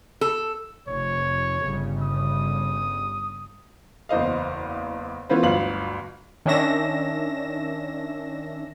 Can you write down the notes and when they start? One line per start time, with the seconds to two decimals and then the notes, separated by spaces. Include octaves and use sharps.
0.21 A4
0.87 F1 C#5
1.62 G1 C#3 G3
2.02 D#6
4.09 F#1 E2 C5 D#5 F5
5.29 E3 B3 C#4 F4 B4 C5
5.43 G1 D2 F#3 F5 F#7
6.46 D#3 C#4 D4 E5 A#6 E7